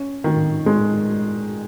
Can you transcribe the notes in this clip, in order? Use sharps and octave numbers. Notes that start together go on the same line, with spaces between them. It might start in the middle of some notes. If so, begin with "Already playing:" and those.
Already playing: C#4
D#3
G#3